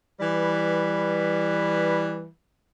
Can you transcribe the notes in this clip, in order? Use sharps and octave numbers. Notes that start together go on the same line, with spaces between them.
E3 G3 B4